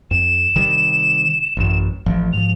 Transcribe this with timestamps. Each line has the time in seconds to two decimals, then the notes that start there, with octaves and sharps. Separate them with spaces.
0.11 F2 E7
0.56 C3 D#3 G3
1.57 A1 F#2
2.06 A1 A2 F3
2.33 G#2 F3 F7